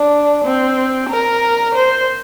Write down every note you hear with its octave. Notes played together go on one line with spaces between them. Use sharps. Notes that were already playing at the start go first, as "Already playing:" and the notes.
Already playing: D4
C4
A#4
C5